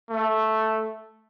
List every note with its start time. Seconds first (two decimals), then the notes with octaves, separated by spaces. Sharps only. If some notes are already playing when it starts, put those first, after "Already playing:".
0.10 A3